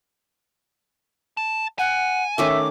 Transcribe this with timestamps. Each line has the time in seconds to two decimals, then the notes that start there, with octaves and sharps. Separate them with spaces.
1.37 A5
1.78 F#5 G#5
2.38 D#3 A3 C#4 E5 D6